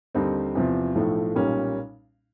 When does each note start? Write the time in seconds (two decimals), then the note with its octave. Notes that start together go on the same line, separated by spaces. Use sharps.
0.15 D#2 D3 G3 C4 D#4
0.55 E2 C3 F3
0.95 B1 A2 F3 A3
1.35 B1 A#2 G3 A#3 C#4